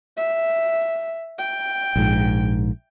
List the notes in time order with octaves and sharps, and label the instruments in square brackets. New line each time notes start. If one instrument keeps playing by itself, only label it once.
[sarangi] E5
G5
[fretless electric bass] A#1 G#2